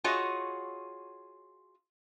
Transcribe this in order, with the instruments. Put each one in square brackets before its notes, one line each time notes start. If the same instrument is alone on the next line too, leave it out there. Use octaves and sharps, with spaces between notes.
[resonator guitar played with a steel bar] F4 F#4 G#4 C#5 D#5